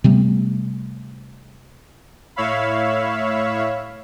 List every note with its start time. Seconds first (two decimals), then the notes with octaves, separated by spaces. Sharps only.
0.04 C3 G3 A3 B3
2.36 A2 C#5 E5 F5 B5